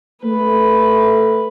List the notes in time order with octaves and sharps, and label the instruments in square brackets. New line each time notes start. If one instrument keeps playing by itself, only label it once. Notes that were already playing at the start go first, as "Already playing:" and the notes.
[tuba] A3 [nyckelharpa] B4